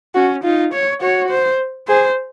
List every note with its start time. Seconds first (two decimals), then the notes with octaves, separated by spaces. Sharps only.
0.15 C#4 F#4
0.44 D#4 F4
0.73 C#5
1.01 F#4 C#5
1.30 C5
1.88 G#4 C5